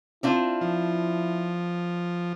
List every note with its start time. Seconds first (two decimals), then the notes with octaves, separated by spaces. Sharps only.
0.23 C4 D4 E4 F4
0.61 F3